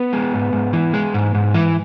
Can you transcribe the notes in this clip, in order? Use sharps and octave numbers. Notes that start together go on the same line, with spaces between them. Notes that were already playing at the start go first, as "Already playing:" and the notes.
Already playing: B3
G#3
G#2
G#2
E3
G#3
G#2
G#2
E3